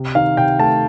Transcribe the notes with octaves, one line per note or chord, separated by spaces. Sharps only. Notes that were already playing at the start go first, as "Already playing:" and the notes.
Already playing: C3
D#3 F5
C3 G5
A3 A5